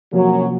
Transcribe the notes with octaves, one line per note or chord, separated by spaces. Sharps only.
F#2 C3 F3 F#3 A#3